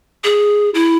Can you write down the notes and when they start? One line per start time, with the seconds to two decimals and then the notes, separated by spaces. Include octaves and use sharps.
0.24 G#4
0.74 E4